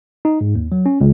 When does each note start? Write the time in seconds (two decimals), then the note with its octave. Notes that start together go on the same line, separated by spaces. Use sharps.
0.25 D#4
0.41 G#2
0.55 D#2
0.72 F#3
0.86 C#4
1.01 C#2